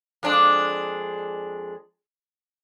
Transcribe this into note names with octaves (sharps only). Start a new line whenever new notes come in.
F2 G#3 D4